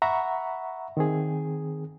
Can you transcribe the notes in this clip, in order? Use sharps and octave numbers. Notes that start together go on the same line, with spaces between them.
E5 F#5 A#5 B5 C#6
D#3 C4 G#4